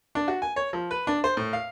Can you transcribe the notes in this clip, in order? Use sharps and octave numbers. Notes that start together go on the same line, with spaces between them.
D4
F#4
G#5
C#5
F3
B4
D4
C5
A2
F5